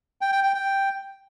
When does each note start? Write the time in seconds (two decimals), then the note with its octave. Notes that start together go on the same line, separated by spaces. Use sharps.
0.21 G5
0.32 G5
0.43 G5
0.54 G5